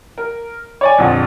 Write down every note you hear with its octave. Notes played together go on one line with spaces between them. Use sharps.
A#4
C#5 D5 G#5
A#1 F2 D3